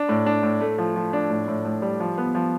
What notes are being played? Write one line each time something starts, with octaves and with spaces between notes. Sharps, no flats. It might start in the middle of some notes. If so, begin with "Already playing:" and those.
Already playing: D4
A2
D4
A2
A3
F3
F3
D4
A2
A2
A2
G3
F3
B3
F3